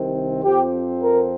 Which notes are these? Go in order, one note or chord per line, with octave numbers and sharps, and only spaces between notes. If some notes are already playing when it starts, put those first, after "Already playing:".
Already playing: C2 C3 D#3 C4
F2 F3 C4 G4
A#4